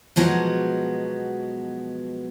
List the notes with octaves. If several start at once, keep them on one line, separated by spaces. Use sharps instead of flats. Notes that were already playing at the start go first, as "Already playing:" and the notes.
B2 F3 F#3 G#3 B3